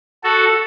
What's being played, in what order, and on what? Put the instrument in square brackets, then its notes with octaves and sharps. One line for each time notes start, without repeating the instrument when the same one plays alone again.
[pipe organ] F#4 A4